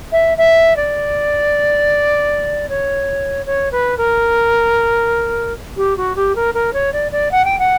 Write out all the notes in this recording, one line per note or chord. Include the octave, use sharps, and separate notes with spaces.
E5
E5
D5
C#5
C#5
B4
A#4
G4
F#4
G4
A#4
A#4
C#5
D5
D5
F#5
G5
F#5